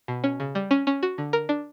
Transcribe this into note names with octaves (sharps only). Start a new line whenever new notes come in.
B2
C#4
C#3
G3
C#4
C#4
F#4
D3
A#4
D4